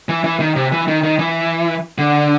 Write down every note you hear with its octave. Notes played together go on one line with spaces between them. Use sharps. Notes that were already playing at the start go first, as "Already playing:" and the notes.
E3
E3
D#3
C3
E3
D#3
D#3
E3
D3